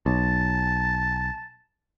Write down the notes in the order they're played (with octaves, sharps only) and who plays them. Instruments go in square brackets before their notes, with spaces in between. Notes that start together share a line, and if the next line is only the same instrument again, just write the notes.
[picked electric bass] B1 [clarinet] A5